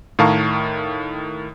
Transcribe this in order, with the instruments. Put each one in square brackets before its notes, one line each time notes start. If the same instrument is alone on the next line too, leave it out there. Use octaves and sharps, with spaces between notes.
[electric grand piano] A2 D#3 F5 A5 A#5 C#6